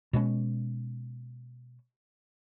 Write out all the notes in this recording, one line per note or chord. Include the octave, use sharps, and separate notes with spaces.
B2 G#3 C4 C#4